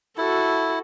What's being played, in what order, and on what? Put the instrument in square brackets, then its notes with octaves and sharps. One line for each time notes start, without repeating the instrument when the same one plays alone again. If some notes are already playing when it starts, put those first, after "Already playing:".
[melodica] E4 [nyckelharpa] F#4 A4